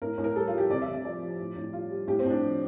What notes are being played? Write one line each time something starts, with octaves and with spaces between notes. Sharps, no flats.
A2 A#4
A2
A#4
G3 A4
F4
G3 G4
C3 D5
E5
C3
E5
F3 D5
F3
A2
A2
G3 F4
G3
A2 G4
C4
A2
D4
F3